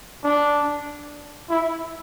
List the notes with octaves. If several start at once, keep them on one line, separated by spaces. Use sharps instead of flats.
D4
E4